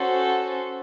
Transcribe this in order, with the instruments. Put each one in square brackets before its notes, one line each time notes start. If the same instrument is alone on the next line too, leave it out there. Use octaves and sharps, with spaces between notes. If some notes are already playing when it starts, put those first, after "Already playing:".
Already playing: [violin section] C#4 F#4 A4 C5